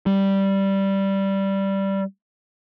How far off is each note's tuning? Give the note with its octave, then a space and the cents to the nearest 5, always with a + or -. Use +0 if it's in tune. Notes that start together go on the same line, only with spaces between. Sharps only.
G3 -5